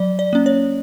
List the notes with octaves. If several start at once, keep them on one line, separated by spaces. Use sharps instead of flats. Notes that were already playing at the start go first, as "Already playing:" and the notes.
Already playing: F#3 D5
D5
A#3 C#4
C#5